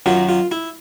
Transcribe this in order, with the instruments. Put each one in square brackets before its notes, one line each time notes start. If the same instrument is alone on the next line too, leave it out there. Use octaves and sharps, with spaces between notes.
[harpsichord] F#2 D#3 F#3 F4
F4
E4